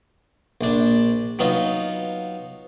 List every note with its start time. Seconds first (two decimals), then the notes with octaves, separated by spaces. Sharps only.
0.61 A#1 D4
1.39 F#3 B3 D#4 F4